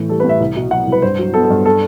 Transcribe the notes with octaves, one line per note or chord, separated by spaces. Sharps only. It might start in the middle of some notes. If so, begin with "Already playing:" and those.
Already playing: A2 E3
G3 A4
B4
A2
E5
C2
B2
F#3 F#5
C2
B4
G2 C5
F#3
B3 A4
A4
G2
A4